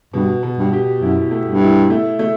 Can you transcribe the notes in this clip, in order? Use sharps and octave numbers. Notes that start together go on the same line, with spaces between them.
G2 B2
B2
G2
G4
F#2 E4
A3
G2
E4
A3
A3